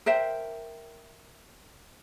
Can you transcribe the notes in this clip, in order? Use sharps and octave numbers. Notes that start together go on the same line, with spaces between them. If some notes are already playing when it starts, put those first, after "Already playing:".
A#4 C5 E5 G5